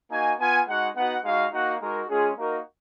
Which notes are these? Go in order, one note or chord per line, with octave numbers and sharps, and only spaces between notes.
A#3 D#4 F#4 G#5
B3 F4 G#5
G#3 D#4 F#4 F#5
B3 D#4 F#4 F#5
G#3 D#4 F#4 F5
A#3 D#4 F#4 F#5
G#3 D#4 F#4 A#4
G#3 C#4 F4 G#4
A#3 D#4 F#4 A#4